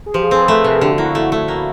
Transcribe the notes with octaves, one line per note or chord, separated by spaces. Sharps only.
G#4
F3 G4
G#4
C4 A4
B4
A3
A#4
C3
G#4
D3 G4
F#4
A#3 E4
A3
A3
A#3